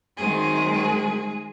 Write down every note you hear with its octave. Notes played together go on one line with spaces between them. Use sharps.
F#2 D#3 F#3 G#3 C4 G#4